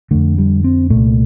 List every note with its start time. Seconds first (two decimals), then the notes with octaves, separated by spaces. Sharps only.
0.11 F2 D3 A3
0.38 G3
0.64 C4
0.90 C2 A#2 A3